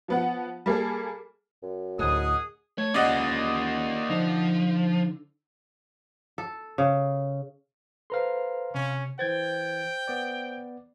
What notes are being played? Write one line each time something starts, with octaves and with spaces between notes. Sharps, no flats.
F3 B3 F#5
G3 A#3 G#4 A4
F#2
D2 A2 G#4 D#5 F#5 D#6
A3 C#5
A#3 C#4 F4 G4 G#4 D5 D#5 F#5
D3 F3 D#4
A4
C#3
A4 B4 C5 F5 A#5 C6
C3 C#4
E3 C5 G5 G#6 A6
B3 D5